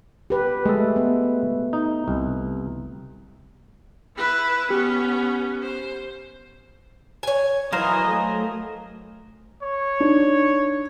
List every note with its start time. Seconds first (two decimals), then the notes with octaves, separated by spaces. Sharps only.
0.30 G4 B4
0.66 G#3 A3 A4
0.96 B3
1.73 D#4
2.08 C2
4.17 E4 B4
4.70 B3 C#4 G4
5.62 C5
7.23 C#5 G#5
7.73 E3 F#3 A#4 C5 D#5 F5 G#5
8.06 A3
9.62 C#5
10.00 D4 D#4